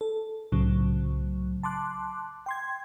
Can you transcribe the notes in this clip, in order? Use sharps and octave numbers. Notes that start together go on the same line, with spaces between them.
A4
C2 A2 C#3 F#3
A5 C6 D6 F#6
G5 C6 G#6